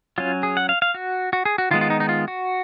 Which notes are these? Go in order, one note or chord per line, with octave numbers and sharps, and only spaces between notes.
F#3 C#4 F4
G#4
F#5
F5
F5
F#4
F#4
G#4
F#4
D#3 G#3 B3 F4
F4
D#4
D#4
F4
F#4